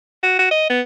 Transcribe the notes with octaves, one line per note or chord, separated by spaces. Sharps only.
F#4
F#4
D#5
B3